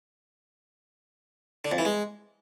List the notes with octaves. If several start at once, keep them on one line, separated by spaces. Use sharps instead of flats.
D3
F2
E3
G#3